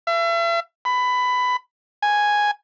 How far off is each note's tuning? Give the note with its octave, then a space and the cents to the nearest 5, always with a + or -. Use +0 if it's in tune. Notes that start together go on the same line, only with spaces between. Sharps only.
E5 +40
B5 +15
G#5 +0